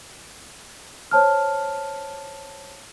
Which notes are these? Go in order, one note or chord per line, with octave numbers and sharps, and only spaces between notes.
C5 C#5 A5 F6